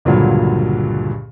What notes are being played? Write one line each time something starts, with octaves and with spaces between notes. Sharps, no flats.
C#2 G2 A#2 D3 F3 F#3